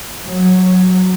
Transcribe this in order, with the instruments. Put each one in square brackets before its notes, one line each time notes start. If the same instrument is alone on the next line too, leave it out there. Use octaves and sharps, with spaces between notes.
[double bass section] F#3